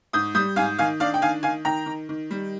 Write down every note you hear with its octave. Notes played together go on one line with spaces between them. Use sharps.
G#2 D#6 G6
G3 D#6 G6
G#2 F5 G#5
D#3 F5 G#5
D4 D5 F5
G5
D#3 F5 G#5
D#3 F5 G#5
D#3 G5 A#5
D#3
D#3
G3